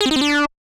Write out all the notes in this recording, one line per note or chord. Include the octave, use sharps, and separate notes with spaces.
G#4
C4
D#4
C4
D4